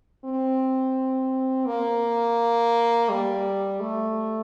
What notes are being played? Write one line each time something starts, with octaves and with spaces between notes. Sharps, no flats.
C4
A#3
G3
A3